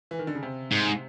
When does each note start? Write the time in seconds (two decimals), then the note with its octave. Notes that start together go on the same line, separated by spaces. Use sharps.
0.11 E3
0.19 D#3
0.27 D3
0.35 C#3
0.43 C3
0.72 G#2